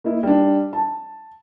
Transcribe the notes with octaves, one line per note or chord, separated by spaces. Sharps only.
A#3 D#4 E4
G3 D4
A5